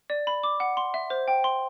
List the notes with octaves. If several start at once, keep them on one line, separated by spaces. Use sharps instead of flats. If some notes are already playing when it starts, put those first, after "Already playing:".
D5
B5
D6
F#5
C6
E5
C5
G5
C6